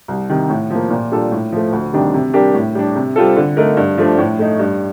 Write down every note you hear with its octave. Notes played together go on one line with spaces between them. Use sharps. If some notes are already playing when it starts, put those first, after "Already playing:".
C2
C3 D#3
A2
F3 A#3
A#2
G3 D4 F4 A4
A2
F3 A3
D2
C3 D#3 G3 D4
C3
G3 D4 G4 A#4
A2
G3 D4
C3
G3 C4 F4 A4
D3
A3 D#4 A#4
G2
F3 A3 D4
A2
A3 D#4
G2